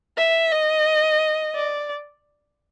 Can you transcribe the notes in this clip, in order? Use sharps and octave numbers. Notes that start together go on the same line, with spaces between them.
E5
D#5
D5